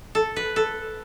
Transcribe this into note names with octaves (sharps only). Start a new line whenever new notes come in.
A4
B4
A4